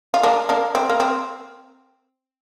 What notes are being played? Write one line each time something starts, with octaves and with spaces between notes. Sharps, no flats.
F4
A#3 D4
A#3 D4
C4
A#3
C4